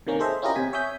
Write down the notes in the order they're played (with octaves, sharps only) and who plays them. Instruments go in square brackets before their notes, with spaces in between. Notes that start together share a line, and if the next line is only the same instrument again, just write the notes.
[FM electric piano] C3 D#3 A#3 C#4
G#4 A4 C5 D#5 E5
C#4 E4 F4 G4 A#4 D#5
C3 G#5 B6
C#5 E5 G#5 D#6 G6 B6